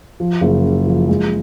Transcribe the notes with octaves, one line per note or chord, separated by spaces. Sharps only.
F3
F#1
C#3
F3
G#3